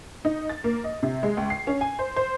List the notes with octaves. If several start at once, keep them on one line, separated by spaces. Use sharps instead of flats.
D#4
A6
A#3
D#5
C3
G#3
C#2
C7
C#4
G#5
C5
C5